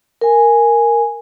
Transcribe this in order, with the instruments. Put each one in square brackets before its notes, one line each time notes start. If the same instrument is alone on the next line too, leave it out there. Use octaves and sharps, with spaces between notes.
[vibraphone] A#4 G#5